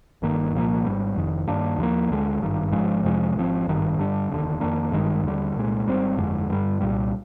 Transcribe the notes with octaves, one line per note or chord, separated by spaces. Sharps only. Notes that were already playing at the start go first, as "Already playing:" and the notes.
G1 G2 D#3 A#3
C2 A#2 F3 A#3
G#1 G#2 G3
F1 F2 D#3
G2 D#3 A#3 D4
D#2 D3 F3 A#3
D2 D3 G#3
G#1 G2 D#3
G#1 G#2 F3 G#3
F2 C3 F3 G#3
G#1 G#2 F3 C4
G#1 G2 D#3
G2 D3 G3 D4
F1 D#2 D3
F2 D#3 A#3 D4
G#1 G2 D#3 G#3
D#2 D3 G3
C2 A#2 G#3
G#1 G#2 G3 C4
G1 F2 D3 G#3
G2 D3 G3
C2 A#2 G3